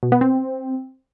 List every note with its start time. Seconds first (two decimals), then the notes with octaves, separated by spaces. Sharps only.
0.03 B2
0.12 B3
0.21 C4